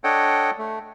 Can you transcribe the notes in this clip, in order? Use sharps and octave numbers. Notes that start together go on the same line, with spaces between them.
D4 A4 C#5 D#5 F#5 G5
A3